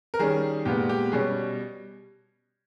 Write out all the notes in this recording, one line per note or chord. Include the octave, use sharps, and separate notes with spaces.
A#4
D#3 G3 C#4 G#4
A#2 G#3 B3 G4
G4
B2 G3 C#4 G#4